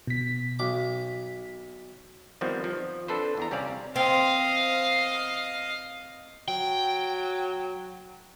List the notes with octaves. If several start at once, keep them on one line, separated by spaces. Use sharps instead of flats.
B2 B6
B1 D6
D#3 F3 G3 B3 C4
F3
C4 D4 A4 B4 C5
E2 D4 A#5
C3 G3 C#4 G4 D5 F5
C4 D#5 F5
F#3 G5